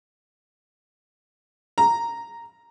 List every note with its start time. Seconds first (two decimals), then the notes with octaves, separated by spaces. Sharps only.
1.78 A#5